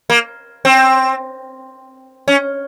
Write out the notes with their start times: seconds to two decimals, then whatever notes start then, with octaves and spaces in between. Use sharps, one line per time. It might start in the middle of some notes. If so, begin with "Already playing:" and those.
0.10 A#3
0.65 C4
2.28 C#4